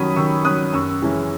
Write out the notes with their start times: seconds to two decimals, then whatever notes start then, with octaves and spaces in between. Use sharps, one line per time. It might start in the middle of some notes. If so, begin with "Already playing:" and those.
Already playing: D#3 F#3 C#4 B5 D#6
0.16 D#3 C#6 E6
0.45 F#3 C#4 D#6 F#6
0.73 F#2 C#6 E6
1.02 E3 G#3 C#4 E4